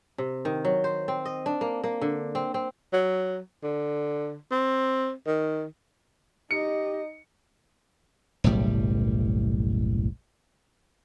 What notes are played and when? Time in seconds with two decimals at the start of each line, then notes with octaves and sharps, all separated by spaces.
0.18 C3
0.45 D#3
0.65 F#3
0.84 C5
1.08 C4
1.25 D#5
1.46 D4
1.61 A#3
1.84 A#3
2.01 D3
2.35 C4
2.54 C4
2.93 F#3
3.63 D3
4.51 C4
5.27 D#3
6.51 D#4 G4 D#5 C#7
8.44 F#1 B1 A2 G3